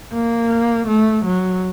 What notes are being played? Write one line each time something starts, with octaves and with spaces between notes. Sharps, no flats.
A#3
A3
F#3